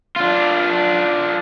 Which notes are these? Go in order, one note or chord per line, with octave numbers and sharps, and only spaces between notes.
D4 F4